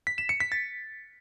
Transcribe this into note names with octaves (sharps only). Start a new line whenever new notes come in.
B6
E7
C#7
B6
A6